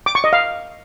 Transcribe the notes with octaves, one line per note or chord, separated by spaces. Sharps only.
D6
C#6
D#5
F5